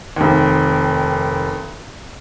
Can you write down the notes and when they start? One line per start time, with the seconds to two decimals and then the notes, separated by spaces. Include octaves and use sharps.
0.16 F1 D#2